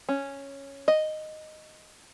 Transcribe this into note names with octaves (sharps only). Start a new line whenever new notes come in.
C#4
D#5